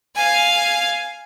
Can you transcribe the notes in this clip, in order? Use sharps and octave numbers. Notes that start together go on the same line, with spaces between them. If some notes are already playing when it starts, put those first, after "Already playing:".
F5 G#5